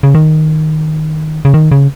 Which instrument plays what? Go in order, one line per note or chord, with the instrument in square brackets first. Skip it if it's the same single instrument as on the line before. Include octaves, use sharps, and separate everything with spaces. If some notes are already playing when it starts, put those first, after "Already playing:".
[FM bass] C#3
D#3
C#3
D#3
C#3